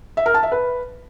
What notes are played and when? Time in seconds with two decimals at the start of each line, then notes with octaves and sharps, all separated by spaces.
0.17 E5
0.26 A#4
0.34 A5
0.43 E5
0.52 B4